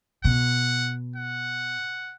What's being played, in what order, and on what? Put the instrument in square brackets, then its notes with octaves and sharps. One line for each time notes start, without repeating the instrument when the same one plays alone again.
[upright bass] B2 [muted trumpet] F#5
[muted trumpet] F#5